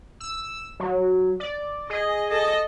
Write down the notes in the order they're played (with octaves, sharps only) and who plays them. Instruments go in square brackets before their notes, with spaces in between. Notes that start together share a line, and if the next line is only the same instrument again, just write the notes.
[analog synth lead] E6
F#3
D5
[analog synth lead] G#4 [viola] D#5
[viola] A4 D#5